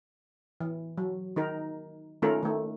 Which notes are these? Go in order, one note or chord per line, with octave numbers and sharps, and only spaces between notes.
E3
F#3
D#3 D#4 A#4
D#3 A3 C#4 F4 A4 A#4
D#3 A3